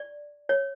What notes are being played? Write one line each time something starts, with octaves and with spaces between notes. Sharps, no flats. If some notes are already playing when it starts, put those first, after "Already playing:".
Already playing: D5
C#5